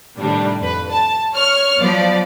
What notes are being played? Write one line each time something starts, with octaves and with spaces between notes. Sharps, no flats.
A2 C3 D#3 G3 D4
F2 B4
A5
C#5 F6
F3 F#3 B3 D5